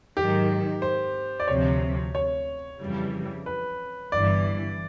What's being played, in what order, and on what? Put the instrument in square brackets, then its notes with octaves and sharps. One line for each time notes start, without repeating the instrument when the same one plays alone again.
[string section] G#2 D#3 F#3 [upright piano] G4
[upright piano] C5
D5
[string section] D2 C3 F3 [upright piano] C#5
[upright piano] C#5
[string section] F2 C#3 E3 G3
[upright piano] B4
[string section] G1 G2 E3 [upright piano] D5